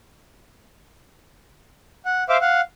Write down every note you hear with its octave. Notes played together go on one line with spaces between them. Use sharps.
F#5
C5 E5 F5 D6
F5 F#5